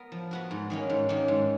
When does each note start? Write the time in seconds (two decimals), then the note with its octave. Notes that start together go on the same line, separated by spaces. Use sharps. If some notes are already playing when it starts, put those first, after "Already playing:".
Already playing: B3 A#4
0.12 F3
0.31 B3 F#4 A#4
0.51 G#2
0.70 D#3 A#3 C#4
0.90 G#2
1.09 D#3 A#3 C#4
1.28 G#2